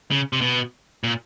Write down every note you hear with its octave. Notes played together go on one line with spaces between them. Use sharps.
C#3
C3
B2
A#2